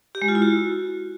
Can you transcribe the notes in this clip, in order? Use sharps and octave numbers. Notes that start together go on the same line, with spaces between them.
G4
G#3
F4
E4
F#4